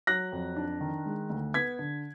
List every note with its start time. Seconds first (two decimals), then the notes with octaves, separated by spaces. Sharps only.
0.07 F#3 F#6 A#6
0.32 F2
0.56 D4
0.81 D#3
1.06 G#3
1.30 D2
1.54 B3 G#6 B6
1.79 D3